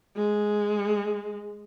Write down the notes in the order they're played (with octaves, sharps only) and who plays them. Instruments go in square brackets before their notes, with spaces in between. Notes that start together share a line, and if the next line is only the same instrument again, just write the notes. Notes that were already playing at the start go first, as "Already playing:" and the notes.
[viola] G#3